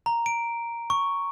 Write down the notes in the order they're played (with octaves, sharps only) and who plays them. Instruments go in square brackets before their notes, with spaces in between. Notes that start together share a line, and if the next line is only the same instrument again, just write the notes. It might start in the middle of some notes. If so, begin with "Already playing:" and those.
[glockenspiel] A#5
D7
C#6